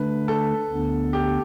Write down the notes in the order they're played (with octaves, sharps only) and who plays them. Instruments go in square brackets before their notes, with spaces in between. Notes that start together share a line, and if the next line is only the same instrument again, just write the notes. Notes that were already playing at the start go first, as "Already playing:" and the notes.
Already playing: [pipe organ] D3 A3 D4 [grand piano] B4
[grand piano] A4
[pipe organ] D2 D3 B3 D4
[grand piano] G4